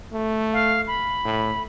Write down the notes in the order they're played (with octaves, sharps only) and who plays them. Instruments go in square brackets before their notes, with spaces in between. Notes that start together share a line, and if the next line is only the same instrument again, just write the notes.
[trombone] A3
[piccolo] F5
B5
[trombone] A2